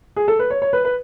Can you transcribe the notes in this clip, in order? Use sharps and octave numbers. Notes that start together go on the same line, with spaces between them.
G#4
A4
B4
C#5
C#5
B4
B4